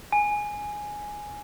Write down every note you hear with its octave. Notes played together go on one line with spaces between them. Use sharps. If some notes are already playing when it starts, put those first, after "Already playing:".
G#5